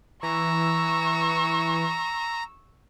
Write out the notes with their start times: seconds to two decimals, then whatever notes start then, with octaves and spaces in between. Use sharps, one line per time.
0.23 E3 A#5 C#6 E6